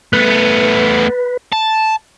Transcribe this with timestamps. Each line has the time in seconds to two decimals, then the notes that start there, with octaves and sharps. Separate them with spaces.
0.13 A3 B3 B4
1.53 A5